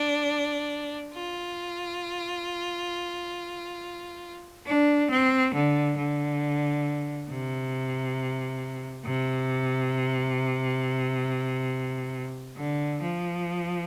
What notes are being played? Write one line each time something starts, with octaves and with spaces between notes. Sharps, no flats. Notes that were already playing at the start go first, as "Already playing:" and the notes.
Already playing: D4
F4
D4
C4
D3
D3
C3
C3
D3
F3